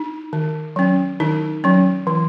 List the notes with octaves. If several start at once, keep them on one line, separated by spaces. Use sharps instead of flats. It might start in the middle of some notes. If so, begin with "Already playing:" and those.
Already playing: D#4
D#3
F#3 C#4
D#3 D#4
F#3 C#4
E3